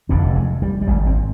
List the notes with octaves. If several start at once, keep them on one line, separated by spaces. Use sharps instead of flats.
F1 F2 D3 C4
G3
G#3
G3
G3
G#1 G#2 G#3
C4